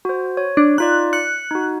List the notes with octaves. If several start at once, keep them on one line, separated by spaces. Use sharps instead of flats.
F#4 C5
C#5
D4
D#4 F4 D5 F#6
F#6 C#7
D#4 F#4